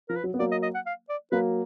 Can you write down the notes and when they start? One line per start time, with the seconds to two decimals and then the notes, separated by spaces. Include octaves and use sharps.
0.09 F3 A#4
0.16 B4
0.24 F#3
0.34 B3
0.39 F#3 A#3 D5
0.52 D#5
0.63 D#5
0.75 F#5
0.86 F5
1.09 D5
1.32 F#3 A#3 B4